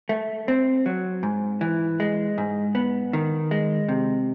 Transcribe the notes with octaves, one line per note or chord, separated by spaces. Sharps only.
A3
C4
F#3
G#2
E3
G#3
G#2
B3
D#3
G#3
C3